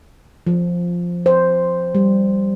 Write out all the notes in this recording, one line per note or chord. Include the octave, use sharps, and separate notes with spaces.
F3
C5
G3